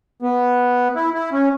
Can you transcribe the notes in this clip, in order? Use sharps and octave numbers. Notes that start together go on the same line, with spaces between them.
B3
E4
E4
C#4